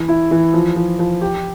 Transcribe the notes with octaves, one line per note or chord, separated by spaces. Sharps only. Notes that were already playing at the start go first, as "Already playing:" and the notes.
Already playing: E3
E4
E3
F3
F3
F3
G4